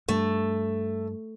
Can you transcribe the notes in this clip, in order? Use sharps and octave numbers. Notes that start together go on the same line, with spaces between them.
G2 A3